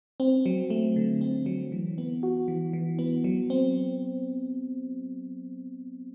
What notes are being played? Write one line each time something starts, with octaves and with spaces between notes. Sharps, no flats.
C4
F#3
A3
D3
C4
F#3
E3
B3
F#4
E3
E3
B3
F#3
C4